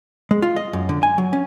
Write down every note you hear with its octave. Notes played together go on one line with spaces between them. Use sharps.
G#3
F4
D#5
F#2
D3
G#5
F#3
C#4